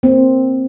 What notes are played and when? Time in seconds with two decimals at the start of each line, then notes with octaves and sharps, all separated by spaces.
0.03 A#3 C4